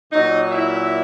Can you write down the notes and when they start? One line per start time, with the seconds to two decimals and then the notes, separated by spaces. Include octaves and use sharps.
0.11 A#2 F#3 D#4 D#5
0.52 E4 E5